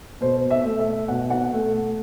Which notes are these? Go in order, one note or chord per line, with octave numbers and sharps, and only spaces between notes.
B2 C5
E5
A3
E5
B2 F#5
F#5
A3